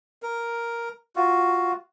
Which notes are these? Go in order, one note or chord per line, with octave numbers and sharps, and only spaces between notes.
A#4
F4 F#4